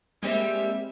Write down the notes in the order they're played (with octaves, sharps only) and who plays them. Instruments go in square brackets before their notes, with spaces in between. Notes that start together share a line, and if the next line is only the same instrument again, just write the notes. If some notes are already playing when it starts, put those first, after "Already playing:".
[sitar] G3 G4 [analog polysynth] G#3 A#3 C4 [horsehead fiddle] E5